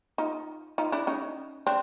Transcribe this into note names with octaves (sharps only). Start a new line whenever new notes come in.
D#4 F4
D#4 F4
D4 E4
C#4 D#4
C4 D4